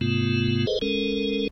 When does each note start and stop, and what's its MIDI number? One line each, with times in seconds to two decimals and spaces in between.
0.01 0.66 44
0.01 0.66 48
0.01 0.66 57
0.01 0.66 59
0.01 0.66 65
0.67 0.79 68
0.67 0.79 69
0.67 0.79 71
0.67 0.79 72
0.67 0.79 75
0.82 1.48 56
0.82 1.48 61
0.82 1.48 69
0.82 1.48 70